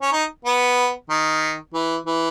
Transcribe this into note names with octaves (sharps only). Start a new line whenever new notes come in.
C#4
D#4
B3
D#3
E3
E3